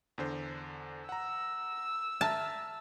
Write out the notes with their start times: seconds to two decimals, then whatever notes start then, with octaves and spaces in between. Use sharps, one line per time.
0.18 E2 D3 C5
1.09 F#5 A#5 E6
2.21 E5 A5 A#5 F6